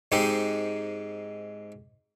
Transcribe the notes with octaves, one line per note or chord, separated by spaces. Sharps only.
G#2 G#3 C4 D#4 G4